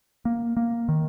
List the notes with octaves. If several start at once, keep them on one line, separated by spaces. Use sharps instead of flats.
A#3
A#3
D#3